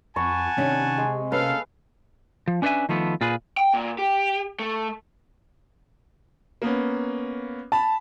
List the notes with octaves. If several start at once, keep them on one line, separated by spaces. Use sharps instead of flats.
F2 F#5 G#5 A5 B5 C#6
C3 D#3 C#4 D4
G#3
A#3 C#4 A4 B4 F5
F3
C#4 D4 B4 C#5 E5 G#5
D#3 F3 A3 B3
A#2 F4 G#4 B4
G5
A#2
G4
A3
A#3 B3 C#4
A5 B5